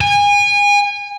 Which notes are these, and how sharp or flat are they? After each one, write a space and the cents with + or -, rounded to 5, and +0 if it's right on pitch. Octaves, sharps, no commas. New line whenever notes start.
G#5 -30